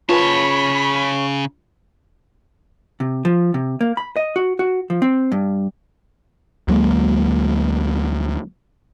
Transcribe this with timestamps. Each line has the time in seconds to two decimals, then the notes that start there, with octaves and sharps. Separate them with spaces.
0.09 C#3 F4 B4 C#5 G#5 A5 B5
3.00 C3
3.25 F3
3.54 C3
3.81 A#3
3.97 B5
4.16 D#5
4.36 F#4
4.59 F#4
4.90 F3
5.02 C4
5.32 G2
6.68 D2 F#3 G#3 A#3